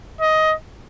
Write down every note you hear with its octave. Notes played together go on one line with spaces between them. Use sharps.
D#5